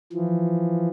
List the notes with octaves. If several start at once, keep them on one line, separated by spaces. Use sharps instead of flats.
E3 F3